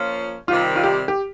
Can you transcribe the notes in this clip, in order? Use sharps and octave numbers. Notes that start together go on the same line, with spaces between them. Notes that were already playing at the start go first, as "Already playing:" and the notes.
Already playing: F3 A#3 C#4 F4
C3 D#3 G3 F4
F4
G4
G4